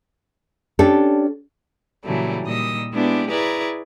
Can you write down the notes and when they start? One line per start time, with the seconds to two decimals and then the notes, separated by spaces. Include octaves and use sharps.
0.79 C#4 D4 G4 A4
2.04 A#2 C#3 E3 F#3 G3 A3
2.45 A#2 D#3 G3 D#5 D#6 E6
2.93 G#3 B3 D4 E4 G4
3.29 E4 G#4 B4 D5 A#5 C#6